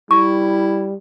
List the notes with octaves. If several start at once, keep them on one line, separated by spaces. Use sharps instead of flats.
G3 E4 C#6